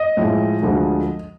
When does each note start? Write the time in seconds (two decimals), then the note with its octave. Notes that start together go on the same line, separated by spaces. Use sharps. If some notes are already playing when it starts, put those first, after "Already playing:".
Already playing: D#5
0.17 A2 F3 G#3
0.62 D2 D3 F3 G#3